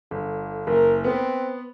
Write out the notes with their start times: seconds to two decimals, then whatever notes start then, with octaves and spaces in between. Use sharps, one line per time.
0.11 G1 D3
0.67 F#1 A#4
1.04 B3 C4 B4